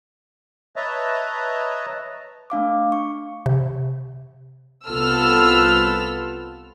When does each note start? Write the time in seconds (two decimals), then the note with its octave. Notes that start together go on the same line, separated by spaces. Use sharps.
0.76 B4 C#5 D#5 E5 A5 A#5
2.50 A3 D4 F5 D6
2.92 C#6
3.46 C3
4.87 C2 B3 F4 A4 E6 F6